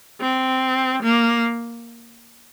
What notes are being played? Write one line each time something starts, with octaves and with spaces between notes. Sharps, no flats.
C4
A#3